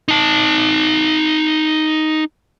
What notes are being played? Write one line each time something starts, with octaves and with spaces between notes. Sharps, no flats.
D#4 A5